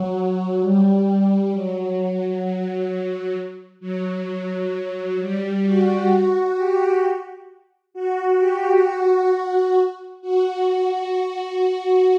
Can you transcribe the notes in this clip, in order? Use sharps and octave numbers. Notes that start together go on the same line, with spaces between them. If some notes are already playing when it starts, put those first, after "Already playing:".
Already playing: F#3
G3
F#3
F#3
F#3
F#3
F#3
G3
F#4
F#4
G4
F#4
G4
F#4
F#4
F#4